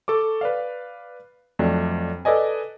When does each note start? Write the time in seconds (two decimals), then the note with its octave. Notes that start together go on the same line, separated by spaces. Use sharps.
0.08 A4 C#6 D6
0.41 B4 D5 F5
1.59 F2 F#3 A3 D4
2.25 A4 B4 D5 D#5 G#5